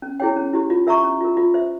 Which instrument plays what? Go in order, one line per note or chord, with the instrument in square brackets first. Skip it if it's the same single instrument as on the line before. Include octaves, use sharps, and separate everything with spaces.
[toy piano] C#4
E4 G#4 C#5 G5
C#4
E4 G4
F4
A#4 E5 A#5 C#6
C#4
F4 A#4
F4
C5 E5